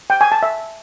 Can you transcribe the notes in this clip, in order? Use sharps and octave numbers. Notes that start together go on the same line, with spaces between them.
G5
G#5
A5
E5